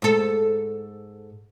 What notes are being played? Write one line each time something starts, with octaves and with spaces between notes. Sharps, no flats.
G#2 A4